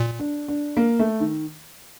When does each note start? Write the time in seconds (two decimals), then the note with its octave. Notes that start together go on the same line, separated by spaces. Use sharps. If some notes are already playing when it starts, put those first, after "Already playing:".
Already playing: A#2
0.19 D4
0.48 D4
0.77 A#3
0.99 A3
1.20 D#3